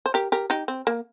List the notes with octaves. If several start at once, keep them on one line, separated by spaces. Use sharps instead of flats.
C5
G4 A#4
G4 A#4
D#4 G4
C4
A#3